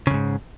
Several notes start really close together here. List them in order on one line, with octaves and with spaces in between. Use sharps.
C#3 F2 G#2